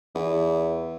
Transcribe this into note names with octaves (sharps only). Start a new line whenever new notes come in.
E2